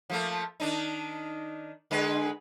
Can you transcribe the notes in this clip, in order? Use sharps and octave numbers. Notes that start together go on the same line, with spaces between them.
F3 A3 A#3
D#3 D4 D#4
D3 G#3 B4